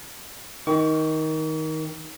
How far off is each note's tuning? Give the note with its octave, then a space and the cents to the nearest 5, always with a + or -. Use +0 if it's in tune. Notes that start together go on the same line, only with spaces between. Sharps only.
D#3 +15 C#6 +45